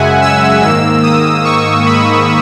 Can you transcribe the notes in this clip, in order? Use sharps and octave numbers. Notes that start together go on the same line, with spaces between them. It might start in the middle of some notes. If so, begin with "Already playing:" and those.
Already playing: F#2 C#3 G#3 E5 F#5 G#5
E6
G#2 D#3 A#3 E6
D#6
C#6
B5